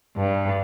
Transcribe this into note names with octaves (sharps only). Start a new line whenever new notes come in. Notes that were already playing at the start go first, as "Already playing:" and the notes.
G2